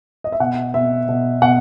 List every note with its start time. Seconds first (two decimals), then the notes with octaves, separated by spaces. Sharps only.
0.24 D#5
0.32 E5
0.40 B2 F#5
0.74 B2 E5
1.08 B2
1.42 B2 F#5